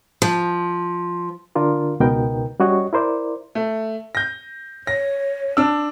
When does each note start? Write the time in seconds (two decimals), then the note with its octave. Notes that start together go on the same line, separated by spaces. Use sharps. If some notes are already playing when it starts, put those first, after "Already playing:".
0.22 F3
1.55 D3 D4 F4 A#4
2.00 C#2 B2 B3 D#4 A#4 G5
2.60 G3 C#4 F#4 C#5 D#5
2.93 E4 A#4 C5 D5
3.55 A3
4.15 G6 A#6
4.87 C#5 A#6
5.57 D4 E6